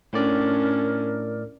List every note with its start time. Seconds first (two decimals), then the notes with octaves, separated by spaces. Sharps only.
0.13 A2 C#4 D4 A#4 D5